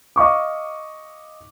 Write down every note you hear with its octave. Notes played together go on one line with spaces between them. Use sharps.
D#5 F5 C#6 D6